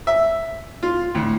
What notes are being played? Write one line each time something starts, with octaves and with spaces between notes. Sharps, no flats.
E5
F4
D2 A2